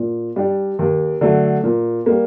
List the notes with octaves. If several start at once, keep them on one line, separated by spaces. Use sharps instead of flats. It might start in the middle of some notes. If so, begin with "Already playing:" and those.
Already playing: A#2
G3 D4 G4
D#2
D3 F#3 A3
A#2
G3 A#3